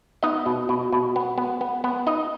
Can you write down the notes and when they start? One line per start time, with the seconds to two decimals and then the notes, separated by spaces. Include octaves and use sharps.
0.23 B3 D#4 D#5
0.46 B2
0.69 B2
0.93 B2
1.16 B3
1.38 B3
1.61 B3
1.84 B3
2.07 D#4 D#5